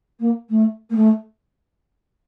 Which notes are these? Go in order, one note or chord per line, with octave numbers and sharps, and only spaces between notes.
A#3
A3
A#3
A3